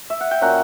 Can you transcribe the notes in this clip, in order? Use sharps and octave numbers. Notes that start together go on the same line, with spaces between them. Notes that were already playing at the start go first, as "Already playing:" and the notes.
E5
F#5
G5
A#2 F#3 C#4 F#5 A#5